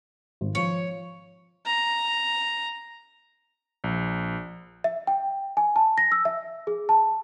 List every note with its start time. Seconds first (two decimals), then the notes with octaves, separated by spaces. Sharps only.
0.41 G#1
0.55 F3 C#5
1.66 A#5
3.84 A#1
4.84 E5
5.07 G5
5.57 G#5
5.76 A5
5.98 A#6
6.12 E6
6.25 E5
6.67 G#4
6.89 A5